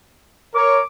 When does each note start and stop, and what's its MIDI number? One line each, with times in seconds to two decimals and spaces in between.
0.55 0.80 70
0.55 0.80 73
0.55 0.84 86